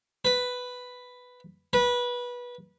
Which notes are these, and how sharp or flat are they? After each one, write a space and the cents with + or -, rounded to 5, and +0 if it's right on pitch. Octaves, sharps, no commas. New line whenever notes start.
B4 +5
B4 -20